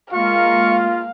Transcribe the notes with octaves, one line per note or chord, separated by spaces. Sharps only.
G#3 A#3 F4 F5 C#6